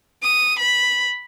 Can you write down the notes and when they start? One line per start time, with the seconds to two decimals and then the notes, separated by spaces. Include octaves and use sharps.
0.24 D#6
0.59 B5